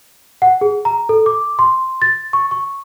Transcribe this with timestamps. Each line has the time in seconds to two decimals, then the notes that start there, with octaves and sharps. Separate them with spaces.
0.42 F#5
0.61 G#4
0.85 A#5
1.09 A4
1.26 D6
1.59 C6
2.02 A6
2.33 C#6
2.51 C#6